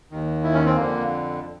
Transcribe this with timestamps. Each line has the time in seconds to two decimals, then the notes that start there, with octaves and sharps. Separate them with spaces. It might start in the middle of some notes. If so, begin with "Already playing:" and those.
0.11 D#2 D#3
0.44 E4
0.54 C#4
0.66 C4
0.75 F2 D3 A#3